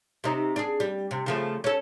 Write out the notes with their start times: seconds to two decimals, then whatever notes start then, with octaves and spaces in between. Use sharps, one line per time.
0.24 C3 D#4
0.56 D4 G#4
0.80 G3
1.11 C3
1.26 C#3 F3 A3
1.64 C#4 A4